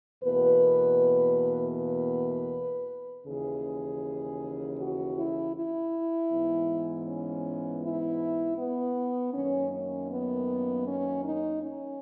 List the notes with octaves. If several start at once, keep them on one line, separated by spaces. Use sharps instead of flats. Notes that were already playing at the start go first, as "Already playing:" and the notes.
E2 B2 A#3 B4
B4
D#2 C#3 E3 G#4
F#4
E4
E4
G#2 E3 B3
C#4
E4
B3
F#2 D#3 A#3 C#4
C#4
B3
C#4
D#4
C#4